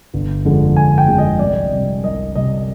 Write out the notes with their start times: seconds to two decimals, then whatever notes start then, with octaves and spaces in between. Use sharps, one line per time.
0.14 G1
0.45 F2 D3 G#3
0.76 G1 G#5
0.98 G5
1.08 F2 D3 G#3
1.18 D#5
1.39 C2 D5
1.72 C3 G3
2.03 C2 D#5
2.35 C3 G3 D#5